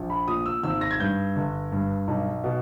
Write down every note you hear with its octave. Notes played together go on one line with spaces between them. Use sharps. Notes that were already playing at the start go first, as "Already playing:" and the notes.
Already playing: A#1
B5
A#2 D#6
E6
G#1 E6
A#6
G#6
G2 G6
G1
G2
B1
B2